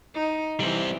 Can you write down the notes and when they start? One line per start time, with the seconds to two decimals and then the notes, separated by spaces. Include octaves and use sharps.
0.14 D#4
0.60 E3 G3 C4